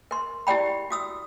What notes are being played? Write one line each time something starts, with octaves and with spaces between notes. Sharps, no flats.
A#4 C6
E4 G4 D5 G5 B5
F#4 D#6 E6